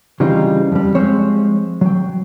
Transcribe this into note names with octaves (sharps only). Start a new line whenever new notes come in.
C#3 E3 G3 C4 D#4 F4
F2 G3
F3 G#3 C4 C5 C#5
F#3 G5